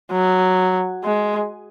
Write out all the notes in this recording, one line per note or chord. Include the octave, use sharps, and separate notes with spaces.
F#3
G#3